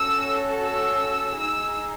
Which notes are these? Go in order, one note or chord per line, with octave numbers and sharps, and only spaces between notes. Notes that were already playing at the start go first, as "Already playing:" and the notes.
Already playing: C#4 F#4 A4 E6
E6
D#4 G#4 E6